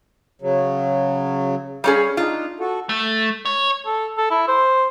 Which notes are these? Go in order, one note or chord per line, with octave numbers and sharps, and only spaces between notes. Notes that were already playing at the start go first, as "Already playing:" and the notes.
C#3 F#3
G3 C#4 G#4 F5
D4 D#4 F4
F#4 A4
A3
C#5
A4
A4
E4
C5